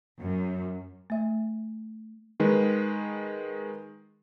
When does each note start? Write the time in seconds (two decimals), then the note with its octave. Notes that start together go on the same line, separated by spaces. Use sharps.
0.20 F#2
1.10 A3 E5
2.40 D#3 G#3 B4